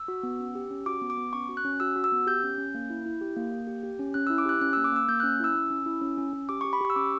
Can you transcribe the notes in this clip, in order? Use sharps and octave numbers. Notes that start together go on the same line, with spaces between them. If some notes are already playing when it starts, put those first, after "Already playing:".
Already playing: E6
F#4
B3
C#4
G4
C#4
F#4 D6
B3
D6
B3
C#4 C#6
F#4
F#6
C#4
F#4 E6
F#4
E6
B3
G4 G6
C#4
C#4
A#3
E4
E4
G4
A#3
A#3
G4
G4
C#4
C#4 F#6
E4 E6
D6
G4 F#6
C#4 F#6
A#3 E6
D6
A#3 E6
A#3 G6
C#4 F#6
E4 E6
C#4
C#4
E4
C#4
C#4
C#4
G4 D6
G4 C#6
B5
G4 C#6
E6
C#4 D6